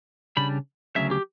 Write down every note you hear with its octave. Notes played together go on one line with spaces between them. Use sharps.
C#3 G3 D4 B5
D2 C#3 F#3 E5
G4